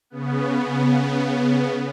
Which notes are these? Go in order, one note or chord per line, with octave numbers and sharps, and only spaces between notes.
C#3 B3